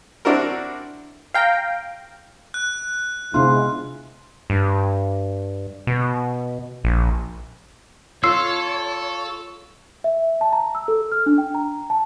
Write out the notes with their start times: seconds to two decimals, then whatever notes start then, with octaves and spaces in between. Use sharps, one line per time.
0.25 C4 D4 E4 F#4 A#4
1.34 F5 G5 A#5
2.54 F#6
3.34 G#2 C3 B3 D4 E4 F4
4.50 G2
5.87 B2
6.84 A#1
8.24 F4 A4 C#5 E6 C7
10.04 E5
10.41 A5
10.53 A#5
10.75 E6
10.88 A4
11.12 F6
11.26 D4
11.38 G5
11.55 A#5
11.90 A5